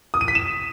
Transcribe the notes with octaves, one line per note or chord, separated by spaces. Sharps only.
D#6
D#7
B6
E7